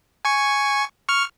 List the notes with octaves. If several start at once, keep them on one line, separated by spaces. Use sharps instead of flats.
G#5 C#6
C#6 F6